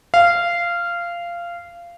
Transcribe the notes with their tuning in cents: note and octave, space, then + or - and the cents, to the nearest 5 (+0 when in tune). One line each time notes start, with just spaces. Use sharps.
F5 -15